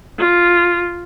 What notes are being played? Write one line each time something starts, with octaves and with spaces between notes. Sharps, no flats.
F4